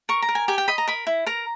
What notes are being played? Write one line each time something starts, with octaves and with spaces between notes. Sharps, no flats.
A#4 C#6
A#5
A#4
G#5
G4 G#5
G5
D#5 B5
A#5
A#4 B5
E4
A#4 A#5